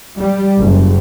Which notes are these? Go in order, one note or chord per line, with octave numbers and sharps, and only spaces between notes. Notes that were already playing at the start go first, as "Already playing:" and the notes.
G3
F#1